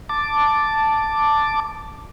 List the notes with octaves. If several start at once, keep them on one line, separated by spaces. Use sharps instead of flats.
A5 D6